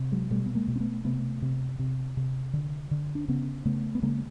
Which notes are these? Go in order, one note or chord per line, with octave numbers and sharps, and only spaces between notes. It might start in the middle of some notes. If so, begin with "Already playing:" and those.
Already playing: C3
F#3 G#3
B2 G3 A3
B3
G#3 A#3
B2
C4
A3 B3
C3 A3 B3
C3
C3
C3
D3
D3
D4
C#3 B3 C#4
C#3 A3 B3
B3
C#3 G#3 A#3